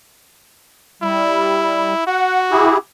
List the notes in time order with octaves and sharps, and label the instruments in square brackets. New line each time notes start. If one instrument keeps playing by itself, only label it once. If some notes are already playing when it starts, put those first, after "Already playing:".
[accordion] G3 [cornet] E4
[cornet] F#4 [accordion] F#5
[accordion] E4 G4 G#4